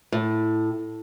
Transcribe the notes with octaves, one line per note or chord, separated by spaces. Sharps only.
A2